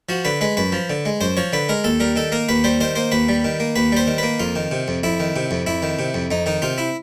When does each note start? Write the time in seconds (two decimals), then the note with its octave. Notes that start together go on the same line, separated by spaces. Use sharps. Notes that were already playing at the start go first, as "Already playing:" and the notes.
0.09 F3 F#4
0.25 D3 B4
0.41 G#3 B4
0.57 F#2 B4
0.72 F3
0.90 D3
1.06 G#3
1.21 F#2 C5
1.37 F3 C#5
1.53 D3 B4
1.69 G#3 A#4
1.84 D#2 A4
2.00 G3 A#4
2.16 D#3 A4
2.32 A#3 A#4
2.49 D#2 B4
2.64 G3 C5
2.81 D#3 C5
2.96 A#3 C5
3.12 D#2 B4
3.29 G3
3.45 D#3
3.60 A#3
3.76 D#2 B4
3.92 G3 C5
4.07 D#3
4.18 A#3 B4
4.40 F2 F4
4.56 D#3
4.71 C3
4.88 F2
5.03 F2 E4
5.20 D#3
5.36 C3
5.51 F2
5.67 F2 E4
5.82 D#3
5.99 C3
6.14 F2
6.31 F2 D#4
6.46 D#3 D#4
6.62 C3 F4
6.78 E4